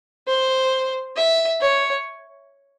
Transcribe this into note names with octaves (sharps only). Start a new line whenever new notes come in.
C5
E5
C#5